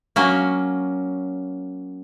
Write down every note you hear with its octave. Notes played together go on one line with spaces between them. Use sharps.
F#3 A#3 C#4